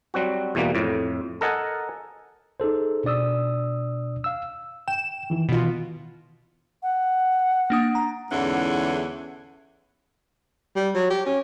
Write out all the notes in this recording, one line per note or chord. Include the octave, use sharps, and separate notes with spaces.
F#3 G3 C4 F#4
E2 B2 E3 G3 A#3
F2 A2
A4 A#4 D#5 F#5 G#5 A5
D#4 G#4 A4 C5
B2 D4 D5 D#6 E6
F5 E6
G5 E7
D#3 E3 E4
B2 F4
F#5
A#3 D4 D#6
A#5
E2 G#2 D3 E3 C#4 F#5
G3
F#3
G4
C#4